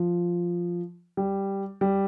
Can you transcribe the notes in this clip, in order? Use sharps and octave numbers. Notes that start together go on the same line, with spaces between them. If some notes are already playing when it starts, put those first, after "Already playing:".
Already playing: F3
G3
G3